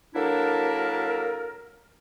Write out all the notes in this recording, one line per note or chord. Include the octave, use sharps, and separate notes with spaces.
F#3 A#3 D4 E4 A4 A#4